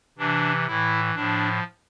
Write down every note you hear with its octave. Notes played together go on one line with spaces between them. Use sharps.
C3 E3 D4
A2 E3 E4
A2 F3 D4